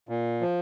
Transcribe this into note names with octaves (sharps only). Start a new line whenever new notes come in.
A#2
F3